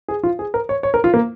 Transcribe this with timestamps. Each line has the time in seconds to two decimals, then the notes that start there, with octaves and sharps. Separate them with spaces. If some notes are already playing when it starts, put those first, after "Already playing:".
0.08 G#4
0.23 F4
0.39 G#4
0.54 A#4
0.69 C#5
0.83 C#5
0.94 A#4
1.04 F4
1.14 A#3